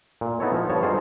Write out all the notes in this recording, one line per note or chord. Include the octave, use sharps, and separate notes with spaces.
A#2
B3 D#4 E4 A4 C#5
F3
G2 B3 C#5 A5
D#4 F4 F#4 G#4 A4 C5